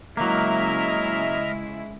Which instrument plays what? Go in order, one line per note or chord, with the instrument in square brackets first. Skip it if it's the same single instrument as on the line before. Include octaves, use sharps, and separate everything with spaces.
[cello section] C#3 G#3 E4 [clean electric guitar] F#3 A#3 [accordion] D#5 E5 F6